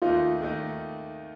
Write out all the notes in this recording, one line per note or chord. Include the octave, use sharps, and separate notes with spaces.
D#2 D#3 A3 D#4 F4
D#2 D#3 A3 D#4